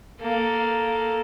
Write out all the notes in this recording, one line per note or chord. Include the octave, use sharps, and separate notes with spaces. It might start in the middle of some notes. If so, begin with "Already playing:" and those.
A#3 A4